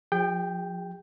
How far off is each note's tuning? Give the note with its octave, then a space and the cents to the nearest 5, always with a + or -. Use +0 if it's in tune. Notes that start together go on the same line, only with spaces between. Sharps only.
F3 +25 G#4 -45 G5 +0